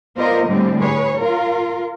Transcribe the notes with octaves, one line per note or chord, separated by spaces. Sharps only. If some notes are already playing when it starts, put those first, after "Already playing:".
B3 F4 A#4 C5 D5 D#5
A2 D3 G3 G#3 C4
G#4 B4 C#5
F4 A#4